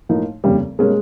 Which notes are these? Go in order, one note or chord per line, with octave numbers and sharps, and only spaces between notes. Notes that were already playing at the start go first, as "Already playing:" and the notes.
A2 F3 A#3 D#4
F1 D#2 C#3 G3
B2 G3 G#3 A#3 C#4